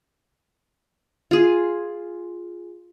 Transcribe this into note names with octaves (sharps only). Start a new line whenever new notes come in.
F4 G#4